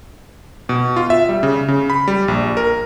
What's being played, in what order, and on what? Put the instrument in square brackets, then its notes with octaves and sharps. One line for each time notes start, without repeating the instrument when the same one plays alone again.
[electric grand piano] B2
F4
E5
G3
C#3
C#3
B5
G3
A#1
A#4